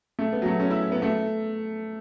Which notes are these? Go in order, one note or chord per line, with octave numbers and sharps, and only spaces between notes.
A3
B3
F#3
A3
C#4
E4
B3
A3